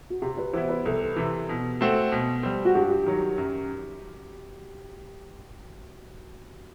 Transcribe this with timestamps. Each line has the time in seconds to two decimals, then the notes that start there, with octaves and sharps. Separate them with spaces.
0.10 F#4
0.22 C3 G4
0.37 B4
0.53 E3 B3 E4 C5
0.69 B4
0.85 C2 A4
1.16 C3 E3
1.49 B2
1.81 A3 C4 F#4
2.12 B2
2.43 G3 C4
2.65 F#4
2.75 G2 G4
3.06 D#3 F#3
3.38 F#2